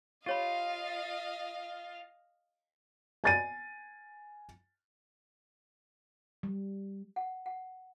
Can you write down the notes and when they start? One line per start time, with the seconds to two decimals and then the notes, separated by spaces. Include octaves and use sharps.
0.26 F4 G4 C#5 D#5 F5 B5
3.24 G#5 A6 D#7
6.43 G3
7.16 F#5
7.46 F#5